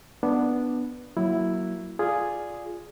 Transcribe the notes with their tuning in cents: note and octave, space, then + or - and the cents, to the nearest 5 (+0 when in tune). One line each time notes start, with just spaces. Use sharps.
B3 -5 D4 +5
F#3 +0 A#3 +0 E4 +0
F4 +0 G#4 +0 D5 +0